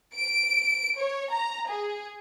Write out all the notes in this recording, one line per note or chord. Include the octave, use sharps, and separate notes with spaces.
D7
C#5
A#5
G#4